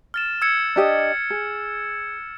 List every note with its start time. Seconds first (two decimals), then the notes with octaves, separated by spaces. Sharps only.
0.14 F6 A6 E7
0.42 E6 G#6 C#7
0.76 D4 G4 D#5
1.30 G#4